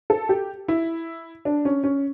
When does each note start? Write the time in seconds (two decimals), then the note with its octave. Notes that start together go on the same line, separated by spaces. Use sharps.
0.10 A4
0.29 G4
0.68 E4
1.45 D4
1.65 C#4
1.84 C#4